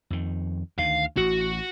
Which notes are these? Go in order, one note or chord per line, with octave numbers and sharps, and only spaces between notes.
F2 D#3
D2 D#3 F5
A1 F#4